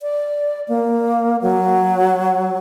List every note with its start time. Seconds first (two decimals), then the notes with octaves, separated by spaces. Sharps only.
0.02 D5
0.68 A#3
1.42 F#3